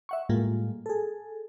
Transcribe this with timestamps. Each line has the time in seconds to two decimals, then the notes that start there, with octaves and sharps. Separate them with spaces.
0.09 E5 F#5 C#6
0.29 A2 G3 G#3 A#3 F4
0.86 G#4 A4